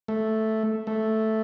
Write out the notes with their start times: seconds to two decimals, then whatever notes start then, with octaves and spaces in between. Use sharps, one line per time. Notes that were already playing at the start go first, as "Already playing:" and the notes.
0.08 A3
0.87 A3